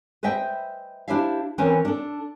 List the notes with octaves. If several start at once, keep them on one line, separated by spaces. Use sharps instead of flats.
B4 C5 D#5 E5 G5
D4 E4 G4 C5 E5 F5
E3 C4 C#4 A#4 B4 C#5
D4 A4